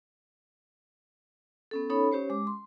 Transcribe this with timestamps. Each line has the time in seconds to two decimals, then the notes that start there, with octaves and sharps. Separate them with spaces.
1.71 B3 C#4 A4
1.90 C#4 D#4 A4 C#5 B5
2.12 C#4 G4 C5 C#5
2.30 G#3 D6
2.47 C6